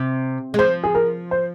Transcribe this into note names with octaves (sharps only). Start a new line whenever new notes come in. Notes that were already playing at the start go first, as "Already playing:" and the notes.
Already playing: C3
G#3
F3 C5
G#4
A#4
C5